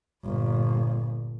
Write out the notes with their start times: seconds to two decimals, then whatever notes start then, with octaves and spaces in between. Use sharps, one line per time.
0.24 G1 A#2